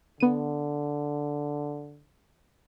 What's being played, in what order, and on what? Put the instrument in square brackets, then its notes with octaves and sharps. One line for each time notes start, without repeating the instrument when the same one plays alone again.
[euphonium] D3 [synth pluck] B3 D#7